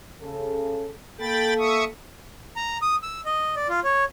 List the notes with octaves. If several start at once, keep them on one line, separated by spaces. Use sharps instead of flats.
C#3 A4
A#3 A4 G5 B5 A6
E5 C#6 D#6
A#5
D#6
E6
D#5
D5
F4
C#5